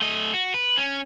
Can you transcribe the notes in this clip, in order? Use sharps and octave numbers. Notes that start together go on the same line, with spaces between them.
A3 D#5
F#4
B4
C#4